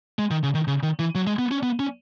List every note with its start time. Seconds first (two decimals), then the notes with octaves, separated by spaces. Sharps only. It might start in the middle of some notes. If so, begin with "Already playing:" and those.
0.19 G#3
0.31 D#3
0.43 C#3
0.55 D#3
0.67 C#3
0.83 D#3
0.99 E3
1.15 F#3
1.27 G#3
1.39 B3
1.51 C#4
1.63 B3
1.79 C#4